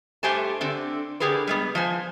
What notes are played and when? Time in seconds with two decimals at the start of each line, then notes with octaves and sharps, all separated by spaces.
0.23 G2 A3 G4 C5 G#5 A5
0.61 D3 C4
1.20 D3 G4 G#4 A#4 B4
1.47 G3 G#3 B3
1.75 F3 C5 G#5